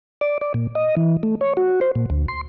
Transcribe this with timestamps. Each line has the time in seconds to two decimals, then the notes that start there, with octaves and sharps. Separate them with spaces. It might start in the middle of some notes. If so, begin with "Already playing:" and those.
0.21 D5
0.41 D5
0.54 A#2
0.75 D#5
0.97 E3
1.23 A3
1.41 C#5
1.57 F#4
1.81 C5
1.95 A#2
2.10 D2
2.28 C6